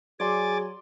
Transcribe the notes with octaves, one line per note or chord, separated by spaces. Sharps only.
F#3 G#4 D5 G#5 C6 D6 A6